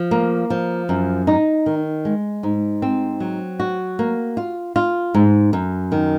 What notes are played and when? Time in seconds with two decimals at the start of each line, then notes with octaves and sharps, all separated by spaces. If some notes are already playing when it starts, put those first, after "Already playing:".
Already playing: F3
0.11 A#3
0.50 F3
0.89 F#2
1.27 D#4
1.66 D#3
2.05 G#3
2.43 G#2
2.82 C4
3.20 F#3
3.60 F#4
3.99 A#3
4.37 F4
4.76 F4
5.14 G#2
5.53 F#2
5.92 D#3